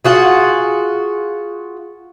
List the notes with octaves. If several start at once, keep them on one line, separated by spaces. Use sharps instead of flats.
F4 F#4 G#4